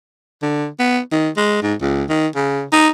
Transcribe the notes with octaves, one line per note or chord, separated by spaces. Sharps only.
D3
B3
D#3
G#3
G#2
C#2
D#3
C#3
D#4